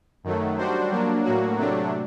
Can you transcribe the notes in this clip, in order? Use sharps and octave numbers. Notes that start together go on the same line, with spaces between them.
F#2 D#3 F#3 A3
G3 D4 F#4 C5
F#3 A#3 D4
A2 F#3 A#3 F#4
C3 F#3 A3 D4